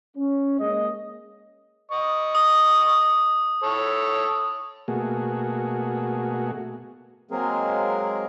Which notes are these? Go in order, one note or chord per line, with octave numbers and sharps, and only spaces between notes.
C#4
G#3 A#3 D#5
D#5 C#6
D#6
A4 C#5
B2 A3 A#3 F#4 G#4
F#3 G#3 A#3 C4 G#4 A#4